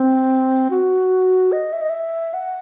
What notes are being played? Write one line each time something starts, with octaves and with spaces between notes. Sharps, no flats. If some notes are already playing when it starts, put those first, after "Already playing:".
Already playing: C4
F#4
D#5
E5
D#5
E5
F#5